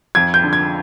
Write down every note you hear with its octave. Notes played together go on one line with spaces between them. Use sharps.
F2 G#6
G6
D3
G#6